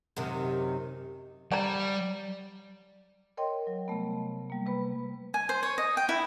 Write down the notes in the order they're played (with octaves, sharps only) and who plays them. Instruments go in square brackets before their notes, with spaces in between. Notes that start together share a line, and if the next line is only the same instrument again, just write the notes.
[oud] F#2 C3 D#3
[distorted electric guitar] G3 [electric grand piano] D5 [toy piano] G5 A#5
[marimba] A#4 C#5 D#5 G5 C6
F#3
C3 G3 A3 B3
G3 A#3
C3 B4 B5
[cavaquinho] G#5
C5
C#5
D#5
G5
E4